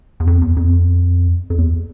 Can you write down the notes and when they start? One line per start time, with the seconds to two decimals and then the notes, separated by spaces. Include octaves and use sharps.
0.20 E2
0.27 F2
0.42 E2
0.57 F2
1.50 F2
1.58 E2